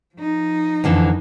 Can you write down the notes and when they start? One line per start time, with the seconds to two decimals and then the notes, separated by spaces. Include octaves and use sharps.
0.15 F3 D#4
0.84 F2 D3 E3